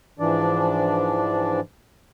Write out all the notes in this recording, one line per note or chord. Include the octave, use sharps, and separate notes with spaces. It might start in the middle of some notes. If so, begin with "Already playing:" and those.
G#2 E3 F3 D4 D5